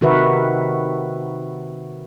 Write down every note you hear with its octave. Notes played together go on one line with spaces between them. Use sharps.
C3 D#3 F#4 A#4 B4 E5